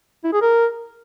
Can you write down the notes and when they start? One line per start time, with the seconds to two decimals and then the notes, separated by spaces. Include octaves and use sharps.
0.24 E4
0.33 G#4
0.42 A#4